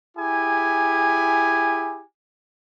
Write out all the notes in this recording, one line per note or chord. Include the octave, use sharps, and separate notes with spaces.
E4 G4 G#4 G#5